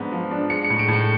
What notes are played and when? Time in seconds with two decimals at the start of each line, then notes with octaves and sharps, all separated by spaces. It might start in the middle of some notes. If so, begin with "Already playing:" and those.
Already playing: G#2 F3 B3 D4
0.12 F3
0.31 D4
0.50 G#3 C#7
0.64 C#7
0.70 A2
0.79 D7
0.88 A2 C#7